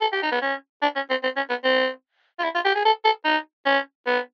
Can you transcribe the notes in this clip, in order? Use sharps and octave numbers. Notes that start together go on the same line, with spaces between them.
A4
G4
D#4
B3
C#4
D4
C#4
C4
C4
C#4
B3
C4
F4
E4
F4
G4
G#4
A4
A4
D#4
C#4
B3